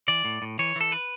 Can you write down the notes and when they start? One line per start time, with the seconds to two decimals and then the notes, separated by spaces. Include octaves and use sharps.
0.08 E3 D5
0.25 A2
0.42 A2
0.59 E3 C#5
0.76 E3 A4
0.92 B4